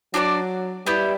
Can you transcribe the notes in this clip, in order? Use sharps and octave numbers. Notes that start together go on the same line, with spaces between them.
F#3 D4 F#4 A4 D5
G3 B3 E4 G4